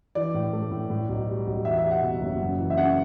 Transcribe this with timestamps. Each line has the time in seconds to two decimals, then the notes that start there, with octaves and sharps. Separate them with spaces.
0.15 E3 D5
0.34 A2
0.53 A3
0.71 A2
0.90 A2
1.09 B1
1.28 G3
1.47 B1
1.65 E2 E5
1.78 E5
1.84 G3
1.91 F#5
2.03 B2
2.21 F#1
2.40 F#2
2.59 E3
2.70 E5
2.77 C#3 F#5